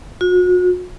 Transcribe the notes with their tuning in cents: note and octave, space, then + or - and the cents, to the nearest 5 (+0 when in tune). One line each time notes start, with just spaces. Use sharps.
F#4 -40